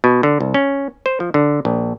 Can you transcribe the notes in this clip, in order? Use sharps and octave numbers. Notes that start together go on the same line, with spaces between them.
B2
D3
C2
C#4
C5
F3
D3
A#1